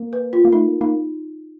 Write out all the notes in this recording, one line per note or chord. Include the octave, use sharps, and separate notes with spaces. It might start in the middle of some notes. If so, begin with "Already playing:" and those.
Already playing: A#3
B4
F4
A#3
A3 D#4
A#3
A#3 D#4